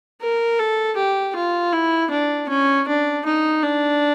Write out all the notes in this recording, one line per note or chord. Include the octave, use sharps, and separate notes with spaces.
A#4
A4
G4
F4
E4
D4
C#4
D4
D#4
D4